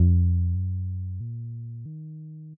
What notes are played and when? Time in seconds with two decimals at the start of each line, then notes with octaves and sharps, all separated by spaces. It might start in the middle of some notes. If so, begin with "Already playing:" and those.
Already playing: F2
0.55 F#2
1.21 A#2
1.86 D#3